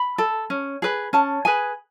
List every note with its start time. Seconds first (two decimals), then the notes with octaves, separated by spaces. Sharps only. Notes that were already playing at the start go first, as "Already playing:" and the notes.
Already playing: B5
0.18 A4
0.50 C#4
0.82 G#4 B4
1.13 C#4 A5
1.45 G#4 B4 G#5